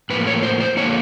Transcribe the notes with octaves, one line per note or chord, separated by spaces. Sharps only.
A2 F3 A#3 B4
C#5
C5
C5
D3 F3 A#3 C#5